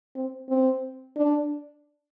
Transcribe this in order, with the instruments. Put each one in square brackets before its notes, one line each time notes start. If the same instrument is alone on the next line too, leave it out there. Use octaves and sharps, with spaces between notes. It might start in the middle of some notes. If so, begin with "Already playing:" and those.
[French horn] C4
C4
D4